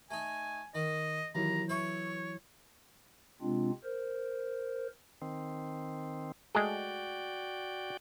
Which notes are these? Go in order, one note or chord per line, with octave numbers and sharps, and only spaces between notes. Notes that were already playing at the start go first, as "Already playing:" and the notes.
A3 D#4 G#5
D#3 D#5
D#2 E3 F#3 E4 A#5
B4 C#5 E5 C#6
C3 G#3 C4 D4 F4
A#4 C5
D#3 C4
G#3 A3 F#4 G#4 D5 G5